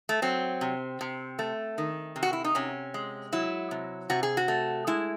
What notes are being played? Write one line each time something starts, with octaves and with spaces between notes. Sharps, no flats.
A3
F#3 C4
C3
C3
A3
D#3
C3
F#4
E4
D#4
C3 C#4
G#3
F#3 E4
C3
C3 F#4
G#4
F#4
A3
G#3 E4